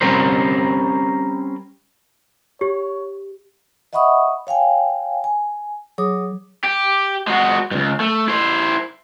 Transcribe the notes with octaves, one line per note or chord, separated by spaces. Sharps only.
G3 C4 C#4 A#4 C5
G4 C#5
D#5 E5 F#5 B5 C#6 D#6
C#5 F5 G5 G#5
G#5
F#3 G#4 C#5 D6 D#6
G4
G#3 F#4
C#2 G2
A3
E4 C5